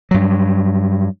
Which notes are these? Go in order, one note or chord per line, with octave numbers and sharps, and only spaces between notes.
G2 F#3